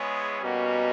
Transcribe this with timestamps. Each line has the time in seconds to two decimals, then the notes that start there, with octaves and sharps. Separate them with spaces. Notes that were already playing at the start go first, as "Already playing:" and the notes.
Already playing: G#3 B3 E4 G#4 C#5
0.42 B2 G3 A#3 C#4 F#4 A#4